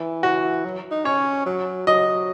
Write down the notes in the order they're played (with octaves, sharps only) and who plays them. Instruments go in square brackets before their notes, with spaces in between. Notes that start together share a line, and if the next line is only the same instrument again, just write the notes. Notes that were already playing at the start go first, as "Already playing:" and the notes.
Already playing: [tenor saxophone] E3
[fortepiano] F#4
[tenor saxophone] F#3
D#4
[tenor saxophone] C#4 [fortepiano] C#5
[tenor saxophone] F#3
[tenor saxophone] F#3 [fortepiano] D#5